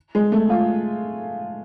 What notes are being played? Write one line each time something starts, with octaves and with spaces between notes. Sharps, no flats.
G#3
A3
F4